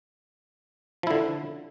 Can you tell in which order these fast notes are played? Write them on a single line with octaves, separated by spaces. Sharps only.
F3 E4 D3